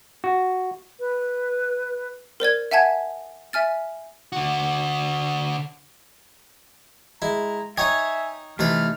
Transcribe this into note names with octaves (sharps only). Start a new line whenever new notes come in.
F#4
B4
A#4 C5 D5 G#6
E5 F#5 G#5 A5 G#6
E5 G#5 F6 A6
D3 F#4
G#3 E4 A#5
D#4 C#5 D#5 E5 G5 G#5
C3 E3 A3 D#4 B4 F6